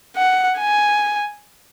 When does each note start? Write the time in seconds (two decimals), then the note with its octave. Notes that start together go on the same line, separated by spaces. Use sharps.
0.16 F#5
0.59 G#5